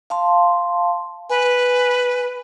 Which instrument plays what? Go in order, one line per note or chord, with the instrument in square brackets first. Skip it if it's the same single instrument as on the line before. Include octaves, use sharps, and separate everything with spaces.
[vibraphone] F5 A5 C6
[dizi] B4 [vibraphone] G#5